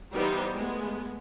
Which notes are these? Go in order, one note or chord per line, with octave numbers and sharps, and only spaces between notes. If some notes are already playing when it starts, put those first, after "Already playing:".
E3 G3 B3 D#4 G4 C5
G#3 A3 B3